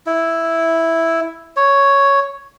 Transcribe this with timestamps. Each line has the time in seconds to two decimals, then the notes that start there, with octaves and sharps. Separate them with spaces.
0.06 E4
1.57 C#5